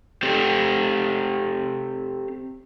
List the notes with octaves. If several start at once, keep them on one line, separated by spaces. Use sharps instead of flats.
C4 G4 A4 C5